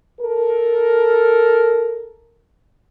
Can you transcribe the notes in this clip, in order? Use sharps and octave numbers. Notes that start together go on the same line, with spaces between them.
A4 A#4